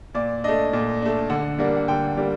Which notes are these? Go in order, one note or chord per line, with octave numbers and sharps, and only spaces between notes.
A#2 D5
A3 D4 D#5
A#2
A3 D4
D3 F#5
G3 A#3 D4
F#5
D3 G5
G3 A#3